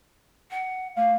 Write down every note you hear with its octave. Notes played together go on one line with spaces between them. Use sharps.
F#5
A3 F5